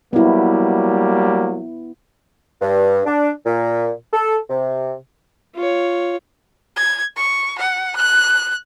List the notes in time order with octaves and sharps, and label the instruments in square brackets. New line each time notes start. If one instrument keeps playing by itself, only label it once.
[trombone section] F#3 G3 A#3 [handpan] B3 E4
[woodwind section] G2
D4
A#2
A4
C3
[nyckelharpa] F4 C#5
[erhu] G#6
C#6
F#5
F#6